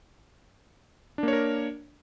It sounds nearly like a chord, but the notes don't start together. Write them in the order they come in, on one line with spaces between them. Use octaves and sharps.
D4 A#3 C#5 A#4